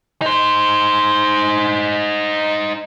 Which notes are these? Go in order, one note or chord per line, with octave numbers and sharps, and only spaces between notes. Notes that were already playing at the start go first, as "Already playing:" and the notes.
D#4 C5